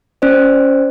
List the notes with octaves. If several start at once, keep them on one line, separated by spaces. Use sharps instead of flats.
C#4 C5 D5